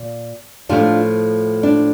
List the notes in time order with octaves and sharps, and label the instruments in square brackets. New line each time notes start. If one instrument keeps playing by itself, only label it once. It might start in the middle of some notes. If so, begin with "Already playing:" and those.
Already playing: [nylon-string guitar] A#2
A2 F3 A3 D4 F4
D4